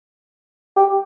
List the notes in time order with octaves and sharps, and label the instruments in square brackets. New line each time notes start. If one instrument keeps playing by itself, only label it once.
[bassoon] G4